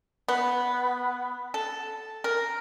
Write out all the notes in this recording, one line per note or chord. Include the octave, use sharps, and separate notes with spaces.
B3
A4
A#4